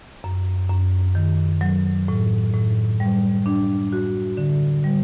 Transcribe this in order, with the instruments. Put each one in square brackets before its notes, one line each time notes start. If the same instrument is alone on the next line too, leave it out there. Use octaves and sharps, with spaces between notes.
[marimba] F#2
F#2
D#3
F#3
A2
A2
G3
D4
F#4
D3
G3